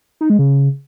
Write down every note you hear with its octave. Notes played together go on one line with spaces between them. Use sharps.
D#4
G#3
C#3